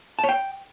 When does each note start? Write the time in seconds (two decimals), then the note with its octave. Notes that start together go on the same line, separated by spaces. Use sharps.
0.19 A5
0.24 C#5
0.29 G5